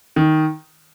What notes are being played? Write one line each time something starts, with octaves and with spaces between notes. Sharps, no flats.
D#3